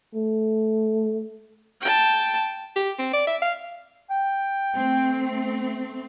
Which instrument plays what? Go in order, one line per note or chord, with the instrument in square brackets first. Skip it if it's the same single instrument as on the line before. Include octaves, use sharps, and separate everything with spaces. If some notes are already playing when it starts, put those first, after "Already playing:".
[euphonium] A3
[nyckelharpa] G5 A5
[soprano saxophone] G4
C4
D5
E5
F5
[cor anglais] G5
[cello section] A3 C4